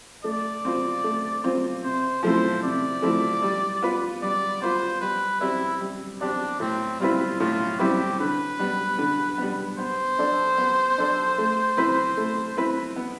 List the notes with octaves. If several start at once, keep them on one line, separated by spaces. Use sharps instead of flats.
A3 D5
C4 F4 C5
A3
C4 F4 C5
C3 C5
F3 A3 C4 E4 C5
C3 D5
F3 A3 C4 E4
G3
B3 F4 B4
G3 D5
B3 F4 B4 C5
G3 B4
C4 E4 G4 D5
G3
C4 D4 G4 D5
A2 C4
G3 C4 E4 F4 B4
A2 F4
G3 C4 E4 G4 B4
D3 B4
G3 B3
D3
G3 B3
B3 C5
D4 A4 D5
B3
D4 A4 D5
A3
C4 E4 B4
A3
C4 E4 B4
B3